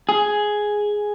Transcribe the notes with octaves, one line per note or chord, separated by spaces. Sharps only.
G#4